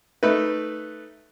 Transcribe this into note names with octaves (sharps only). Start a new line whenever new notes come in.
A3 D#4 B4